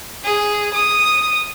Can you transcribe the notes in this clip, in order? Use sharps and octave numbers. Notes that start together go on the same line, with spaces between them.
G#4
D#6